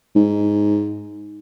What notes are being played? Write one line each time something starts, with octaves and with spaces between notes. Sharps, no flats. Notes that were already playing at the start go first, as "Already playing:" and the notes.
G#2